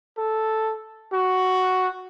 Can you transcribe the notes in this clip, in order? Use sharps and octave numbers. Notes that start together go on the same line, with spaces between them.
A4
F#4